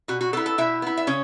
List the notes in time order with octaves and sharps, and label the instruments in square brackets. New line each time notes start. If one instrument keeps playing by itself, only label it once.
[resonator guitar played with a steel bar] B2 F#4
F#4
B3 E4 A4
A4
B2 E4 E5
B3 E4
E5
C#3 C#4 C#5